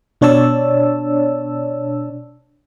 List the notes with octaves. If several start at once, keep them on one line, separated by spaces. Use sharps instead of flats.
B2 D4 C#5 D5 A5 E6